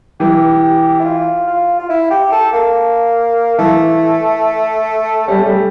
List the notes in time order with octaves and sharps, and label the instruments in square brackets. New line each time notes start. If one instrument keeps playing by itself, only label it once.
[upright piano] E3 [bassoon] G4
[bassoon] G4
E4
F4
F4
F4
E4
G4
A4
A#3
[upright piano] E3 [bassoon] A3
[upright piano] G3 [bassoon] C#4
[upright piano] A3
G3